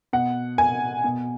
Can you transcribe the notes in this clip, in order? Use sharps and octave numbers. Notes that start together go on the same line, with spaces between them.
B2 F#5
G#5
B2